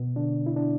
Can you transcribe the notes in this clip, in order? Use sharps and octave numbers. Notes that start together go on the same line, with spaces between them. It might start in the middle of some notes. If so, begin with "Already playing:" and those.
Already playing: B2 B3
D3 D4
E4
D4